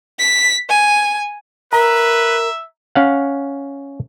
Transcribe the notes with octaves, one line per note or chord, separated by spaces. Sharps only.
B6
G#5
A#4 B4 E5 A#5
C#4 F5 F#5